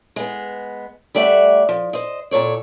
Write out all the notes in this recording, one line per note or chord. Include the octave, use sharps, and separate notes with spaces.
G#3 B3
G3 A3 D5 E5 F#5
F3
C5 D#5
A#2 A4 C#5 D5